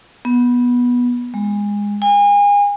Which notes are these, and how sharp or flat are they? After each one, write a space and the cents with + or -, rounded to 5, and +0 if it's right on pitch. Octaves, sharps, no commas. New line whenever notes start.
B3 -15
G#3 -20
G#5 -35